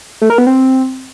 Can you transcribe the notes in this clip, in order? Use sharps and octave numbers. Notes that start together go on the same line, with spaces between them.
A3
A#4
B3
C4